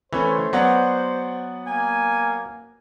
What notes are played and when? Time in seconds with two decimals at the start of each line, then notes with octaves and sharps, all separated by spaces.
0.13 E3 A3 C#4 C5
0.53 F#3 B3 D5 F#5
1.66 A#3 G#5